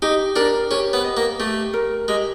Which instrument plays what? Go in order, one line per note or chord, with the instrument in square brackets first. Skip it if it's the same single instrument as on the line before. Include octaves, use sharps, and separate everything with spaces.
[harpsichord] D#4 [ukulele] G4
[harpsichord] D4 [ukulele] A#4
[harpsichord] C#4 [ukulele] G4
[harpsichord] B3
[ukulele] D#5
[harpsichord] A#3
[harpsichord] A3 [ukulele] G4
[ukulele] A#4
[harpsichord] G#3 [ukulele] G4